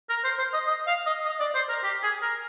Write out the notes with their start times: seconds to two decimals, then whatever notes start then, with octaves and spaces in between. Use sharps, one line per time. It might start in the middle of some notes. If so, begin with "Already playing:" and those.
0.10 A#4
0.24 C5
0.39 C5
0.53 D#5
0.67 D#5
0.87 F5
1.06 D#5
1.26 D#5
1.40 D5
1.55 C5
1.69 A#4
1.84 G4
2.03 G#4
2.22 A#4